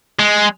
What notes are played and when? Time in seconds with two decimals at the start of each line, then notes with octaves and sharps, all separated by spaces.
0.19 G#3